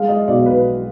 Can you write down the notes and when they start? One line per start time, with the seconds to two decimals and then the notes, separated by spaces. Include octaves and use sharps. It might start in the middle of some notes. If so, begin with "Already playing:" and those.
Already playing: G#3 F5
0.09 D#5
0.28 B1 D5
0.46 B4